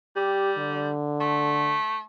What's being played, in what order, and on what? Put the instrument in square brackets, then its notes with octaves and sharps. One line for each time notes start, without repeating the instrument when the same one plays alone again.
[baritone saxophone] G3 [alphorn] G4
[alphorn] D3
[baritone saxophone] A3